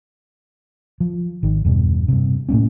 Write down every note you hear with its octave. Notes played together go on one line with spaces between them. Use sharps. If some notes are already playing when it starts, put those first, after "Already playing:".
F3
G#1 D#3
E2 G2 B2
G2 C3
A2 A3 A#3 C#4